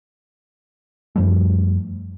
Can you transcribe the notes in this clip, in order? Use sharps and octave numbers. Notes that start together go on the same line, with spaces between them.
F#2 F3 G3 A3